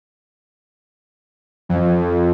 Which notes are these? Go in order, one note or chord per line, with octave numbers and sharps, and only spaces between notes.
F2